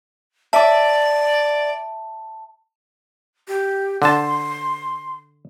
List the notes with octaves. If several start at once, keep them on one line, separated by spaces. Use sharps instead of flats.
D5 E5 A5 D6
G4
D3 A5 C6